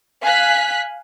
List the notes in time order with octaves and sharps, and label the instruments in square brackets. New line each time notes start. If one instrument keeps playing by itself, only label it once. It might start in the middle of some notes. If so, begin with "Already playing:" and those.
[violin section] F5 G#5 F#6 B6